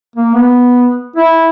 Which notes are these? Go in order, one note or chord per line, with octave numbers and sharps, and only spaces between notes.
A#3
B3
E4